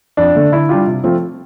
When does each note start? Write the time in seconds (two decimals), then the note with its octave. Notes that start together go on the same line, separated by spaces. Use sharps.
0.17 F2 D4
0.35 D3 A3
0.52 D3 E4
0.69 G3 D4 F4 G4
0.87 C3
1.03 F3 A3 C4 F4